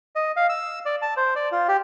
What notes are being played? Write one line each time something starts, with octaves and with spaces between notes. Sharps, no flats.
D#5
F5
E6
D5
A5
C5
D5
F4
G4